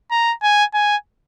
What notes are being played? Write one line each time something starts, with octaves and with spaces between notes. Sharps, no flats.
A#5
G#5
G#5